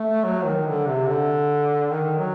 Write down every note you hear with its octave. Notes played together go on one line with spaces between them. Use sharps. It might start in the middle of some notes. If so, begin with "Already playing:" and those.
Already playing: A3
F#3
D#3
D3
C3
D3
D#3
F#3